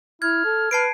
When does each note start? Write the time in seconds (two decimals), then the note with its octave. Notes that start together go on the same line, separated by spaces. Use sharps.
0.22 E4 F6 G#6
0.45 A4
0.71 B4 A5 C7 D7